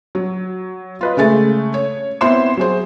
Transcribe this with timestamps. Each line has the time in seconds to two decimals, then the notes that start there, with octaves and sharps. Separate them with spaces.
0.15 F#3
1.01 F4 B4 D#5
1.17 C#3 G#3 A3 A6
1.74 C#5
2.21 B3 C4 E4 C5 C6 E7
2.57 F#3 G#4 C5